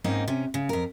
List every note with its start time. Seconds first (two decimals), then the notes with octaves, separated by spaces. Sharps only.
0.04 G#2 A#3 C4 C#4 D#4
0.28 C3 C#4
0.54 C#3
0.69 F2 A#4